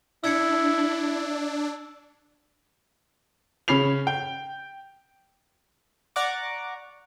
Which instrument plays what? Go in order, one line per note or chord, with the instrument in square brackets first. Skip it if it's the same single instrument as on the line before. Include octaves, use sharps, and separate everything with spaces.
[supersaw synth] D4 [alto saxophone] E4 [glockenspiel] E6 G#6 C#7
[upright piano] C#3 C#4 B5 C7 F7
G5
[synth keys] D5 F#5 A#5 C#6 D6